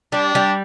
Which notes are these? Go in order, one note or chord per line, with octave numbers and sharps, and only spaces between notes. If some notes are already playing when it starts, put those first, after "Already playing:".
G3 D4
G3